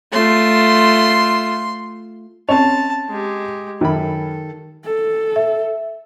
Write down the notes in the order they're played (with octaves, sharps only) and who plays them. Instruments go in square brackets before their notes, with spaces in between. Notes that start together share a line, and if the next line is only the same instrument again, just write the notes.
[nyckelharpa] A3 F4 [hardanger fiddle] C6
[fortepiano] C4 C#4 C#5 [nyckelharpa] A5 [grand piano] F7
[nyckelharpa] G#3 G4
[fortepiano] F#2 B5 [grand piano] D#3 [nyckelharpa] A4
[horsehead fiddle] A4
[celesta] E5